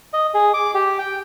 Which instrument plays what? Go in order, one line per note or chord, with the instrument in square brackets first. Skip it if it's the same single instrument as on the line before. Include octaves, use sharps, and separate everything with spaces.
[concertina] D#5
G#4
D6
G4
G5